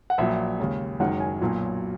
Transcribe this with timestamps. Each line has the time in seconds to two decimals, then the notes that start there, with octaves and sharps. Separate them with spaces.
0.10 F#5
0.18 A#1 A#2 F#3 E5
0.59 D#2 C#3 G#3
1.00 F#1 F#2 D#3 G#3 F#5
1.20 G#5
1.41 B1 A#2 F#3